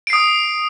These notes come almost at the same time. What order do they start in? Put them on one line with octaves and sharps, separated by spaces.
D7 C7 D#6